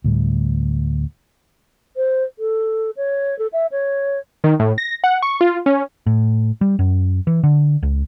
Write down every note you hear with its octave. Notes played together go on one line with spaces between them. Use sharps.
D2 A2 G3
C5
A4
C#5
A4
E5
C#5
D#3
A2
A#6
F#5
C#6
F4
C#4
A2
G3
F#2
E3
D3
C#2